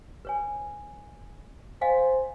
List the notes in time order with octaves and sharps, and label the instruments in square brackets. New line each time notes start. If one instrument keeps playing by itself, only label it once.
[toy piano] B4 C#5 G#5
[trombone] C5 [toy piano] D#5 F5 G#5